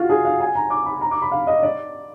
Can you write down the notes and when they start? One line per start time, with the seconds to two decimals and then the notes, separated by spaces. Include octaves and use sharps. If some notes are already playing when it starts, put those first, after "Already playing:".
Already playing: F4 F#4
0.09 G#4
0.25 F5
0.40 G#5
0.55 A#5
0.70 D6
0.86 B5
1.01 A#5
1.11 D6
1.22 B5
1.32 F5
1.47 D#5
1.63 D5